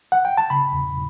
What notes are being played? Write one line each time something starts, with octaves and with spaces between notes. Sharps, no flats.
F#5
G5
A5
C#3 B5
E2